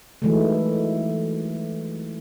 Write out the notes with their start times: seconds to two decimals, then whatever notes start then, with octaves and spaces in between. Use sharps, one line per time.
0.22 D#3 E3 F#3 G#3 A3